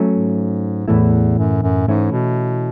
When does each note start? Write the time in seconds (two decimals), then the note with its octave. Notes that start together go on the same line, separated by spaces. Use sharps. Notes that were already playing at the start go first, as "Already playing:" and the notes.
Already playing: F#3 A3 C#4
0.13 G#2
0.88 E2 A2 E3 A3 E4
1.38 F#2
1.63 F#2
1.88 G#2 E3 A3 C#4 E4
2.12 B2